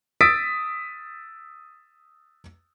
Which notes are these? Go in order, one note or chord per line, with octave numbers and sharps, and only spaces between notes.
D#6 E6 A6 B6 D7